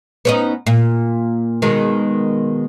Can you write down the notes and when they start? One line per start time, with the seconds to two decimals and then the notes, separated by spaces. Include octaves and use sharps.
0.25 B3 C#4 D#4
0.66 A#2
1.62 B2 D#3 G#3